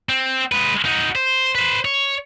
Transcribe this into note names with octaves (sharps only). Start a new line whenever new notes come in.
C4
G#3 B4
D#4 F#4
C5
B4 C5
C#5